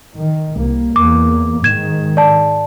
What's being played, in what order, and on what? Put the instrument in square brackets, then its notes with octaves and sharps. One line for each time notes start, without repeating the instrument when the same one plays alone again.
[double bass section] D#3
C2 A#3
[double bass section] E2 A#3 [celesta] D6
[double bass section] G#2 D#3 [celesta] G#6 E7
[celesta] D5 A5